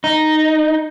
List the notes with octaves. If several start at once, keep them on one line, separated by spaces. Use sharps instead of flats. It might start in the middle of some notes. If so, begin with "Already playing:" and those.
D#4